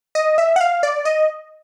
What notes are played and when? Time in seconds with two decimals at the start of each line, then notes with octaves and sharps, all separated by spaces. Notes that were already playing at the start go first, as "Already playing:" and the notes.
0.15 D#5
0.38 E5
0.56 F#5
0.61 F5
0.83 D5
1.05 D#5